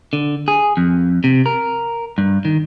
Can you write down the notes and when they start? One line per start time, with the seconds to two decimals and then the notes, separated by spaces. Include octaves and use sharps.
0.13 D3
0.48 G#4
0.77 F2
1.24 C3
1.46 A#4
2.18 G2
2.45 D#3